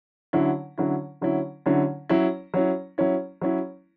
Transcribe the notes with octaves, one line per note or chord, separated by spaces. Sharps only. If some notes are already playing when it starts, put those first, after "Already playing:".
D3 F#3 C#4 E4
D3 F#3 C#4 E4
D3 F#3 C#4 E4
D3 F#3 C#4 E4
F#3 C#4 E4
F#3 C#4 E4
F#3 C#4 E4
F#3 C#4 E4